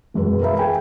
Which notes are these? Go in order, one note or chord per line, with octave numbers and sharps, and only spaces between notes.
E1 F#2 G#3 B4
A#4 B4 E5 F5 A#5 B5
G#4 G5 G#5